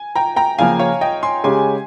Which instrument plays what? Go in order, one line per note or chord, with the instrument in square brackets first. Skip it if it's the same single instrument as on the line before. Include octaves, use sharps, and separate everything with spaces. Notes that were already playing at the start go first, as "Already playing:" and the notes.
Already playing: [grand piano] G#5
G5 A#5
G5 A#5
[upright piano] C#3 F3 A#3 [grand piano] F5 G#5
[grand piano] C#5 F5
D#5 G5
G#5 C6
[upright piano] C#3 G#3 C#4 G4 [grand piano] G#5 C6